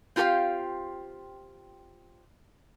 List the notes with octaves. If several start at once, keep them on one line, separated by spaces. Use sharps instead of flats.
C4 F4 G4 A4 F5 G5